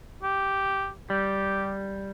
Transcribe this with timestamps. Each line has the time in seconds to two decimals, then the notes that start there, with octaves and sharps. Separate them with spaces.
0.23 G4
1.10 G3 G4